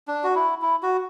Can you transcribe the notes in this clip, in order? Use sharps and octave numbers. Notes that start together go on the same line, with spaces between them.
D4
F#4
E4
E4
F#4